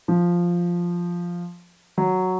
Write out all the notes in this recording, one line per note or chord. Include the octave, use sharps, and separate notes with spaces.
F3
F#3